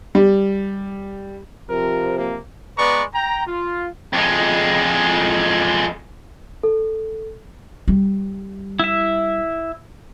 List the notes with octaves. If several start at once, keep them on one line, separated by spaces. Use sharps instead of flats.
G3
C3 F3 A#4
A#3
G#3 B3 B4 D5 A#5 C#6
G5 A#5
F4
F2 G#3
A4
G3
E4 E5